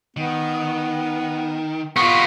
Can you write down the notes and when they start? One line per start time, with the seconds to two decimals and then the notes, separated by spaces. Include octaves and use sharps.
0.17 D#3 B3
1.96 B3 F4 C#6